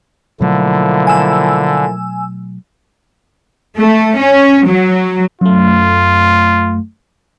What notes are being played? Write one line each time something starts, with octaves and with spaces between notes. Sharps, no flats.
B2 D3 F3 F#3 A3 A#3 E4
G#5 E6
A3
C#4
F#3
F#2 A3 F4